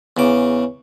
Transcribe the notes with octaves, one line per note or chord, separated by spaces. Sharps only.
E2 C#3 D6